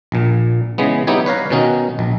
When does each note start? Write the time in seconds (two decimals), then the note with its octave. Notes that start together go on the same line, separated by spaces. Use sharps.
0.12 A#1 A#2
0.78 C#3 E3 G#3 B3
1.07 G3 B3 D#4 E4 G4 C#5
1.26 B4 C#5 F5 A#5
1.50 B2 D#3 C#4 D#4 F#4
1.99 A#1